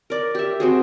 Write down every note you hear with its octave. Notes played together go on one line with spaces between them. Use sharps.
A#4 D5
G4 E5
C4 F#4 G#4